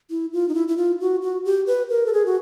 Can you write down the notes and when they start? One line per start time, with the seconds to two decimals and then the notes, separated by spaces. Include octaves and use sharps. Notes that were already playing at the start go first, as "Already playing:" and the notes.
0.10 E4
0.33 F4
0.48 D#4
0.54 E4
0.68 E4
0.77 F4
1.00 F#4
1.22 F#4
1.45 G4
1.67 B4
1.90 A#4
2.06 A4
2.13 G#4
2.26 F#4